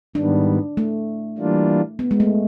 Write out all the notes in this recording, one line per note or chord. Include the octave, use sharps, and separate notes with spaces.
G#2 D#3 G3 B3 D4
A3
E3 G3 A#3 D4 F4
B3
G#3
A3